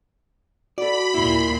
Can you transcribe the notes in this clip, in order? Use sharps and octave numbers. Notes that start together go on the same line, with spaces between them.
F#4 A4 D5 B5
D#2 A#2 E4 C6